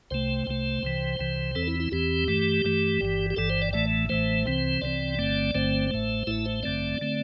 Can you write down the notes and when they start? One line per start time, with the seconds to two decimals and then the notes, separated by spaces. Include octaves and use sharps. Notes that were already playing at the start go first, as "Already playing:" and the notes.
0.11 C2 C3 A3 C5
0.47 C2 C3 A3
0.83 C2 C3 E3
1.19 C2 C3 E3
1.55 E2 E3 C4 A4
1.67 E4
1.80 E4
1.92 E2 E3 C4 G4
2.28 G2 E3 A3
2.65 G2 E3 A3
3.01 G1 G2 E3
3.30 G4
3.36 G1 G2 E3 A4
3.50 C5
3.62 D5
3.73 A1 A2 E3 A3 D5
4.09 A1 A2 E3 A3 C5
4.46 C2 C3 E3 C4
4.82 C2 C3 E3 C4 D5
5.19 G1 G2 D3 A3 C4
5.55 G1 G2 D3 A3 C4 C5
5.91 A1 A2 A3
6.27 A1 A2 A3 E4
6.45 C5
6.63 A1 G2 D3 A3 C4 D5
7.01 D3 A3 C4